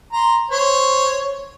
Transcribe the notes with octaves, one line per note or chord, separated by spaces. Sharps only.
A#5 C6
C5 C#5